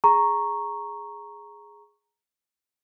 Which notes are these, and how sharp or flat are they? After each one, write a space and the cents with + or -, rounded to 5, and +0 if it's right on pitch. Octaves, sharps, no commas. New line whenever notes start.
G#4 +0 A#5 +0 C#6 -5